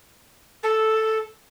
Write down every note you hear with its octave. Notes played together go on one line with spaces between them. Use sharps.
A4